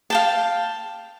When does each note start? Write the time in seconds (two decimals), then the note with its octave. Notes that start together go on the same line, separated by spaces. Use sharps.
0.10 F5 G5 A5